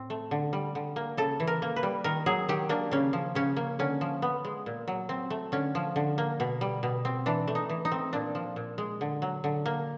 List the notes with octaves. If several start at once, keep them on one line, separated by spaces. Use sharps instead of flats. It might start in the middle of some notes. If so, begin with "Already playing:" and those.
Already playing: A2 C4
A3
D3
G3
D3
A#3
C#3 A4
E3
A#4
A#3
B4
G3
D#3 A#4
F#3 G#4
D#3 G4
A#3 D4
C#3 C#4
F3
C#3 C#4
A#3
D3 C#4
F3
B3
G#3
A#2
F#3
C4
A3
D3 C#4
F3
D3
A#3
B2
G3
B2
C4
E3 D4
A3
D#4
E3
D#4
C4
A#2 D4
F3
A#2
G#3
D3
F#3
D3
A#3